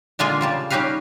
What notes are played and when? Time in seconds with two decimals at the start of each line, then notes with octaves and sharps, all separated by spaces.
0.19 A#2 D3 G#3 A#3 F4 G#5
0.41 C#3 G3 A5
0.70 G3 C#4 D#4 G4 B4 F5